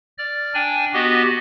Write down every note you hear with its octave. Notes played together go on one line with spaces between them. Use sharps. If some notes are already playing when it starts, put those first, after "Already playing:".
D5 F6
D4 G5 G#5
B3 F#4 G4 D#5